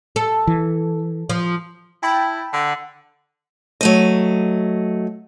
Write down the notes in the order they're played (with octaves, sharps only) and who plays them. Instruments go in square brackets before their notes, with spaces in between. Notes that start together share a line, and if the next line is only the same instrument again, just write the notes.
[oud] A4
[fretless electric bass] E3
[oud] F3
[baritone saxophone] E4 [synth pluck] G5 A5 B5
[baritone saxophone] D3
[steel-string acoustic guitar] F#3 A3 D#5